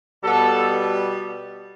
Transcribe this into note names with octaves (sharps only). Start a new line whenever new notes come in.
B2 G3 B3 A4